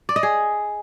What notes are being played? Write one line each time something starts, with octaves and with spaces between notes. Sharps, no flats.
D5
D#5
G#4